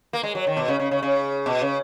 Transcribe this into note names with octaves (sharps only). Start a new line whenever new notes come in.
A#3
G#3
F#3
D#3
B2
C#3
C#3
C#3
C#3
B2
C#3